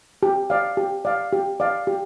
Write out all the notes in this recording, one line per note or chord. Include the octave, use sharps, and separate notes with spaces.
G4
D5 F5
G4
D5 F5
G4
D5 F5
G4